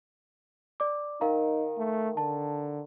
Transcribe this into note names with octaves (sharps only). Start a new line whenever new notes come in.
D5 D6
D#3 D#4 A#4 F5 A#5
A3
D3 A5